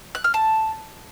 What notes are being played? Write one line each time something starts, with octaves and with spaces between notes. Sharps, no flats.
F#6
F6
A5